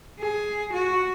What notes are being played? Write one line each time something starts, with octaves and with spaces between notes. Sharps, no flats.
G#4
F#4